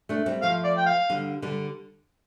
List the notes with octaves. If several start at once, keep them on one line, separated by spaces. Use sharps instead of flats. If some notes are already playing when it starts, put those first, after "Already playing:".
A3 D4
G3 C4
F3 A3 F5
D5
G5
F5
D3 G3
D3 G3